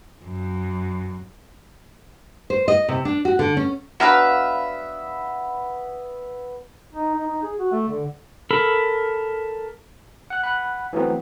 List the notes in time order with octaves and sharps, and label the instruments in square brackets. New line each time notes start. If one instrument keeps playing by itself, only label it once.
[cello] F#2
[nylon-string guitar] C5
D#5
C3
D4
F#4
D3
C#4
[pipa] F#3 D4 B4 [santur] B3 [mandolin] E5 F5
[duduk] D#4
D#4
D#4
G#4
F#4
A3
D3
[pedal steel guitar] A4 A#4 B5
[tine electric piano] F#5 F#6
F#5 B5 F#6
E3 F#3 A3 B3 C4